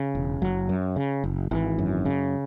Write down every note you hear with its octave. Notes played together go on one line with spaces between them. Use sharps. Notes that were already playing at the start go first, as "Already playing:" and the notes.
Already playing: C#3
E1
F#1 F#3
F#2
C#3
F#1
G#1 E3
F#2
C#3